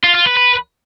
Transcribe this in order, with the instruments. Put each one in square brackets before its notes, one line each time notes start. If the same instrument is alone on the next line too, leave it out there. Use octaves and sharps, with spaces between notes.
[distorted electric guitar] F4
F4
B4
B4